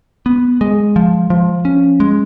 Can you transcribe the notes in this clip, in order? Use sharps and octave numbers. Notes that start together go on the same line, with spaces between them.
B3
G#3
F3
F3
C#4
G#3